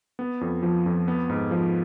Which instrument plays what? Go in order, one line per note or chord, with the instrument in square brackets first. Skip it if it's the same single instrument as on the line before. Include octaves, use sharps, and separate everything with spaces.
[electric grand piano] B3
F2
F3
F2
B3
G#2
F3